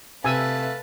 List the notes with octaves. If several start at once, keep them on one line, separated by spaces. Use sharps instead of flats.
C3 A3 B4 F5 G#5 A5 E6